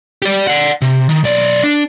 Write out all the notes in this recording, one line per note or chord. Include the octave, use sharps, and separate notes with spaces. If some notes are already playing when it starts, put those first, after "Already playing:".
G4 D5
D5 F#5
C3
D#3
B1 D5
D4